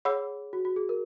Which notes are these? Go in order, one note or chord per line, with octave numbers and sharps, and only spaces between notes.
G#4 C#5 F#5 B5 E6
F#4
F#4
G#4
A#4